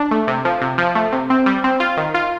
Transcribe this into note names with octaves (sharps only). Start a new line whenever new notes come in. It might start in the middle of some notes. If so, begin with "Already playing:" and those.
Already playing: D4
A3
C3
F3
C3
F3
A3
C3
C4
G3
C4
F4
D#3
F4